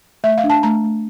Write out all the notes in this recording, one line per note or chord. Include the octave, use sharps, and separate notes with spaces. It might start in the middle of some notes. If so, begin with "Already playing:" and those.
A3 E5
F5
D4
A5
A3 A#5
A3